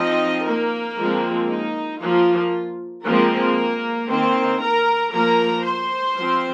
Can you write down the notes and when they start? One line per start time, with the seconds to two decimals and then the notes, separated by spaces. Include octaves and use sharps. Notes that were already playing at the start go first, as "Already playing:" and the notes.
Already playing: F3 C4 D#4 D#5
0.45 A#3 A#4
0.98 F3 G#3 C4
1.50 D#4
2.01 F3 A#3 F4
3.04 F3 G#3 A#3 C4 A#4
4.09 D#3 A#3 C4 C5
4.60 A#4 A#5
5.12 F3 A#3 A#4 A#5
5.64 C5 C6
6.17 F3 C4